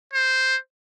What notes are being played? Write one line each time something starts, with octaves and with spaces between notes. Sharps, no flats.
C5